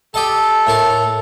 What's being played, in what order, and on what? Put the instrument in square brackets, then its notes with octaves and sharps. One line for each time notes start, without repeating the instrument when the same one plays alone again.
[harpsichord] G4 D#5 A5 [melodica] A4
[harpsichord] A2 A#4 A5